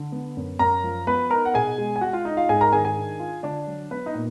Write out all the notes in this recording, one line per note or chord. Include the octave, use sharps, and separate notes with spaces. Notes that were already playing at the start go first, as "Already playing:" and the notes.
Already playing: D3
B3
F#2
F#2 A#4 A#5
F3
B3 B4 B5
D#4 A#4 A#5
F#5
B2 G#4 G#5
G#3
G#5
G#3 F#4 F#5
F4 F5
D#4 D#5
F4 F5
G#2 G#4 G#5
A#4 A#5
D#3 G#4 G#5
G#4 G#5
D4
F4
D3 D4 D5
F#3
B3 B4
D#4 D#5
A#2